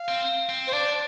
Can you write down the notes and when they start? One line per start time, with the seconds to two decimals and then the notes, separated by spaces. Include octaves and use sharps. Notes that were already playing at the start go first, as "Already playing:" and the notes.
Already playing: F5
0.08 C4
0.49 C4
0.67 C5
0.73 D4 D5